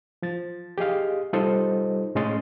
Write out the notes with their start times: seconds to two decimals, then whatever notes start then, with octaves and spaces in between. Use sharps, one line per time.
0.22 F3 A6
0.78 G4 G#4 D#5 F5
1.33 G3 D#4 F4 A4 C5 D#5
2.15 A2 G#3 C#4 D#5 C6 A6